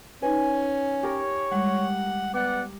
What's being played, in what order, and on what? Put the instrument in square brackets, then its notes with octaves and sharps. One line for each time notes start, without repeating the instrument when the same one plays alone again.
[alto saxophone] C#4 [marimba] D#4 B4 [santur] G#5
[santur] G4 A#4 [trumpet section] C#5
[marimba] G3 G#3 [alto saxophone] F#5
[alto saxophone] B3 [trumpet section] D5 F#5 [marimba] D6